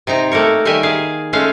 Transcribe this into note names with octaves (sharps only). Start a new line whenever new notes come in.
C3 D#4 A#5
A3 A#3 A#4 C#5
D#3 G3 G4 E5 G#5
G#4 F5
G#3 A3 C#4 F5